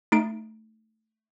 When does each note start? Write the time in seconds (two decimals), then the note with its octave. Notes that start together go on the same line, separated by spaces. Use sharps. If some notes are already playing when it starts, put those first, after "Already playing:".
0.12 A3 D#4 D7